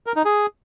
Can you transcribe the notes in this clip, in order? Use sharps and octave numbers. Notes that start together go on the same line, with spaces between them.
A#4
D#4
G#4